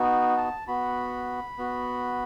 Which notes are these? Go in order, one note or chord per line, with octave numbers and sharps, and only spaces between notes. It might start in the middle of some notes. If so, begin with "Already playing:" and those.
Already playing: B3 D#4 F#4
A5
B3 F#4 B5
B3 F#4